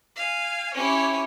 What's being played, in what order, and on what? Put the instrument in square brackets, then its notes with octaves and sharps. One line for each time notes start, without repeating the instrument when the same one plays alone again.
[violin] F5 G#5
[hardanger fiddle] C#4 E4 [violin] G4 C#5